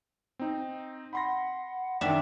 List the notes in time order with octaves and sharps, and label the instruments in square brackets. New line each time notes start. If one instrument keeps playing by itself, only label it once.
[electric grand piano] C4 D#4
[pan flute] F#5 [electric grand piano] B5 C6 A#6
[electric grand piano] F#2 D#3 [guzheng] D4 E5 [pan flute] G5